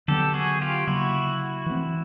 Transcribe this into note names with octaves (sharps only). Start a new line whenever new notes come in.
D3 F#3 B3 G4 A4
F#4 G#4
F4 G4
C#3 F#3 A#3 E4 F#4
E3 A3 C4